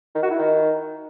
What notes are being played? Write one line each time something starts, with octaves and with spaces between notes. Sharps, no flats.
D#3
F#4
E4
D#3